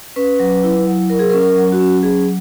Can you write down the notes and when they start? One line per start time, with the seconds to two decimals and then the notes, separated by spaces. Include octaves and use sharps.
0.16 C#4 B4
0.40 F#3
0.64 E4
0.86 F#3
1.10 F#3 A#4
1.19 G#4
1.30 A#4
1.33 C#4
1.41 A#4
1.56 F#3
1.72 F#4
1.80 C#4
2.03 F#3 G#4